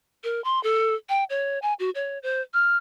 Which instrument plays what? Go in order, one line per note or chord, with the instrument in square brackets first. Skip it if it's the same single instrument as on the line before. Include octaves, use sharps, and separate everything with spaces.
[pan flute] A#4
C6
A4
G5
C#5
G#5
F#4
C#5
C5
F6